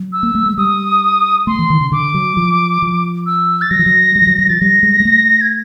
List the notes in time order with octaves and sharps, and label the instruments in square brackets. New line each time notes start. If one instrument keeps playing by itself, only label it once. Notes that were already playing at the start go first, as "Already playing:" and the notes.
Already playing: [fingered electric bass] F#3
[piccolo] E6
[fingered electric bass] A#3
A3
G#3
[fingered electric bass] G3 [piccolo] D#6
[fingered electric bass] A3 [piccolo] C6
[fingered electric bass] E3
D#3
C#3
[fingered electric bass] D3 [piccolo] D6
[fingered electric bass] F#3
F3
F3
[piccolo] E6
A6
[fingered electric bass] F#3 [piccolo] A#6
[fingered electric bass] F3
F#3
G3
F3
F#3
F#3
[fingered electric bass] F3 [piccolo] A6
[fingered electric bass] G3 [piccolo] A#6
[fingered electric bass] G#3
G#3
A3
[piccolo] G#6